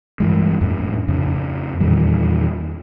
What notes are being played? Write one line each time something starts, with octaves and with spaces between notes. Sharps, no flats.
G2 E3 G#3
F2 A2
F2 C#3
E2 A#2 D#3 G3